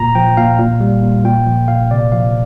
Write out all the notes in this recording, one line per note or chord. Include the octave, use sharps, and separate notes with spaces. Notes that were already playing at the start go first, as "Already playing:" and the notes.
Already playing: A#2 A#5
F3 G5
A#2 F5
A#2
G3
A#2
A#2 G5
F3
A#2 F5
C3 D5
F3 F5